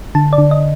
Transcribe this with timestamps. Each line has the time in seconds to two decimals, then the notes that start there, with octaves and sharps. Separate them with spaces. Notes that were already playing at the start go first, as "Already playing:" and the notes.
0.15 D3 A5
0.33 D5
0.38 D3
0.51 D#5